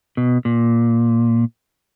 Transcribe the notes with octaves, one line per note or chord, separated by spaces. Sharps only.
B2
A#2